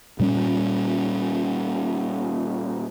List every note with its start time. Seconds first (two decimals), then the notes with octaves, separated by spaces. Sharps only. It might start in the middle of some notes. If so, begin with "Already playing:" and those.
0.20 A#2 G3 G#3 C#4